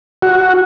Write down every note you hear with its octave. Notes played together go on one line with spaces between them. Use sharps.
F#4